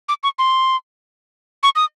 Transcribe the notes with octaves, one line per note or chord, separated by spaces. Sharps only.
D6
C#6
C6
C#6
D#6